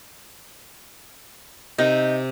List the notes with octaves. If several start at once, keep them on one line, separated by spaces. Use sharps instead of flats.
C3 D#4